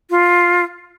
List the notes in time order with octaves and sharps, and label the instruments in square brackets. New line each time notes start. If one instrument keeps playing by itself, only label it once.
[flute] F4